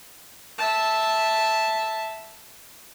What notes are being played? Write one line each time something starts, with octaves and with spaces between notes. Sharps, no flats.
E5 A5